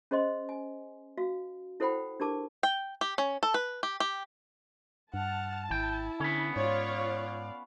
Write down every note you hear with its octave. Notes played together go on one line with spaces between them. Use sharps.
C#4 G#4 C5 D#5 C6
G#5
F#4 F5
E4 A4 C5 F#5 G5 B5
D4 G4 A#4 A5 D6
G5
G4
C#4
A4
B4
G4
G4
G2 F#5 A5 F6
G#1 E4 G5
D3 B3 C#4
G#2 F4 C#5 D5 F5